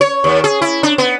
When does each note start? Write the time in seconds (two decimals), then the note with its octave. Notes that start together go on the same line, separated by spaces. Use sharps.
0.01 C#5
0.24 D#2
0.44 G#4
0.62 E4
0.83 D4
0.98 B3